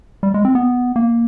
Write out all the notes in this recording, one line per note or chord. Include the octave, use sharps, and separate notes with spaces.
G3
G#3
C4
B3
A#3